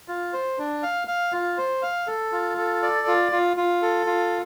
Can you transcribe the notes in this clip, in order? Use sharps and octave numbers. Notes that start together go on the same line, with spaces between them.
F4
C5
D4
F5
F5
F4
C5
F5
A4
F4
A4
D5
F4
F4
F4
A4
F4